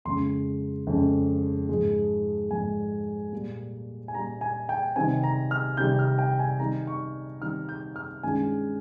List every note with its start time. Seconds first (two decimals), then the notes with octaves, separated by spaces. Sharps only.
0.05 F2 C#3 G#3 C#4 C6
0.87 F2 C#3 G#3 C#4
1.69 G#2 F3 G#3
2.51 G#2 F3 G#3 G#5
3.32 A#2 G3 A#3
4.08 G#5
4.14 A#2 G3 A#3 A#5
4.41 G#5
4.69 G5
4.96 C3 D#3 G3 C4 G#5
5.23 A#5
5.51 F6
5.77 C3 D#3 G3 C4 G6
5.99 F6
6.19 G5
6.39 G#5
6.59 D#3 G3 C4 D#4 A#5
6.87 C#6
7.42 D#3 G3 C4 D#4 F6
7.69 G6
7.96 F6
8.23 G2 D#3 G#3 C#4 F4 G#5